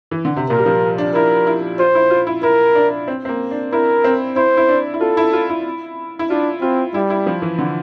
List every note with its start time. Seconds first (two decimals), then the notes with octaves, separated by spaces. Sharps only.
0.11 E3
0.25 D3
0.37 C3
0.50 A#2 A#4
0.58 G3
0.66 F3
0.98 D4
1.14 E4 A#4
1.47 E4
1.79 F4 C5
1.95 E4
2.10 F4
2.27 E4
2.43 E4 A#4
2.75 D4
3.08 C4
3.25 C4
3.29 A#3
3.51 D4
3.72 E4 A#4
4.04 C4
4.36 E4 C5
4.57 E4
4.69 D4
4.94 E4
5.01 F4 A4
5.17 E4
5.33 F4
5.50 E4
6.19 E4
6.30 D4 F4
6.61 C4 F4
6.94 G3 E4
7.10 E4
7.27 F3
7.42 E3
7.59 D3